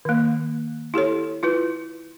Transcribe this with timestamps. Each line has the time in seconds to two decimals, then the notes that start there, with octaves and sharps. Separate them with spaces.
0.05 D#3 A#3
0.94 E4 G4 A4 C#5
1.43 E4 F4 B4